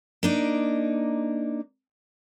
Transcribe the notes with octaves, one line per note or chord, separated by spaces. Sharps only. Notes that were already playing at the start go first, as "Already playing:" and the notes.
A#3 D4 D#4